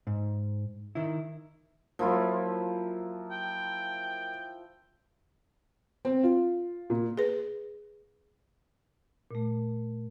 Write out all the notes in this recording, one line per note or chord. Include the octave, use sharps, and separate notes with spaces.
G#2
D#3 E4
F3 F#3 A#3 E4 F4
G5
C4
F4
A#2
G#4 B4
A#2 A3